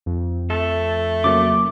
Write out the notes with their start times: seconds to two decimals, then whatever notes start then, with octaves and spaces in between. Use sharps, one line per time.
0.06 F2
0.50 A3 A4
1.24 C#3 F#3 A#3 D6